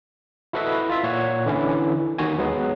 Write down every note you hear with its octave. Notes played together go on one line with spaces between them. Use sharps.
E4 F#4 A4 B4 D#5 E5
F4 E5
A#2 C#5 F#5
D3 E3 C#4 E4
D#2 D#3 F#4 G#5
F#3 G#3 B3